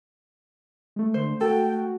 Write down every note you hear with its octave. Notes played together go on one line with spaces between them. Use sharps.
G#3 A3
D3 C5
F#4 A4 G5